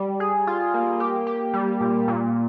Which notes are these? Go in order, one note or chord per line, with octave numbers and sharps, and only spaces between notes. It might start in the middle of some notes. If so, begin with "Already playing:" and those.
Already playing: G3
G#4
F4
A#3
G4
G4
G3
A#2
A#2